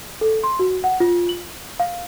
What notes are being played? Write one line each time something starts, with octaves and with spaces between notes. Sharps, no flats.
A4
C6
F#4
F#5
F4
F#7
F5